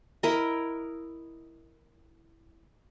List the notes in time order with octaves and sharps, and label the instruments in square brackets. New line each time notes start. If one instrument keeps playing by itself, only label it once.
[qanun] E4 A#4 D#5